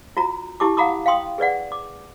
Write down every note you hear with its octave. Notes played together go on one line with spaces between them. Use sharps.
F4 F#4 A#5
E4 G4 A5 D6
F5 F#5 A#5 B5 D6 D#6
F5 G5 C6 D#6
G#4 B4 D5 F#5
D6